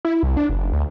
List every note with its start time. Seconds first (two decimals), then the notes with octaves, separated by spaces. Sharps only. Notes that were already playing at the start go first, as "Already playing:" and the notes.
0.05 E4
0.23 C2
0.37 D4
0.50 F#1
0.73 D2